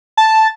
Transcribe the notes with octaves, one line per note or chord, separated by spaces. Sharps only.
A5